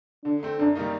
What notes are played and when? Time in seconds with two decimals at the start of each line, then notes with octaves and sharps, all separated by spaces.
0.25 D3 D4
0.43 A3 C4
0.59 F#2 D4
0.76 D#3 G3 A#3 D#4